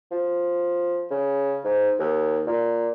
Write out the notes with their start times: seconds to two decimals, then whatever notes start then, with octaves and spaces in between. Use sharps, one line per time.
0.11 F3
1.11 C#3
1.64 G#2
1.99 D#2
2.47 A#2